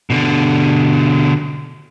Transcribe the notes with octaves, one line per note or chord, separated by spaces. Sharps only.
B2 D3